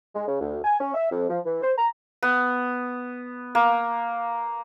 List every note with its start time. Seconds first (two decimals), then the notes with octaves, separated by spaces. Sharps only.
0.14 G#3
0.26 C#3
0.40 D2
0.63 G#5
0.80 C#4
0.94 E5
1.11 F2
1.29 F3
1.45 E3
1.61 C5
1.77 A#5
2.23 B3
3.55 A#3